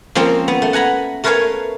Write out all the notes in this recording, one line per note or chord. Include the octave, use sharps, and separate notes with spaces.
F3 A#3 C4 C#4
B3
A3
F#5 G#5 A#5 B5
A3 A#4 B4 C#5 F5 G#5